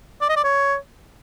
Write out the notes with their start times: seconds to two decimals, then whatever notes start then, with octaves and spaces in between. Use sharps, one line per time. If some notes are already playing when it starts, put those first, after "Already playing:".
0.21 D5
0.29 D#5
0.36 D5
0.44 C#5